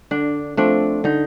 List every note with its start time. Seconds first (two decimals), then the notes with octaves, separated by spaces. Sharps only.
0.11 D3 D4
0.58 F3 A3 C4 D4
1.04 D3 D#4